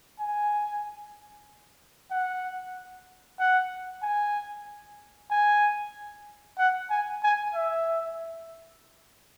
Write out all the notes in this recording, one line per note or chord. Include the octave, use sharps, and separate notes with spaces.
G#5
F#5
F#5
G#5
G#5
F#5
G#5
G#5
E5